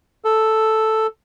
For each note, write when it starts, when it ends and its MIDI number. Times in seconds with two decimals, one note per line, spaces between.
0.25 1.07 69